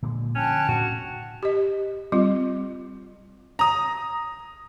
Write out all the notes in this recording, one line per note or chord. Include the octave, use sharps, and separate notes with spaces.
A#2 D3 G#3
D3 F3 C#4 G5 A5 F#6
A2 D4 F#4
G4 D#5
G3 C4 F4
A#5 D#6